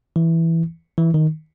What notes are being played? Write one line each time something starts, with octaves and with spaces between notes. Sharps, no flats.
E3
E3
D#3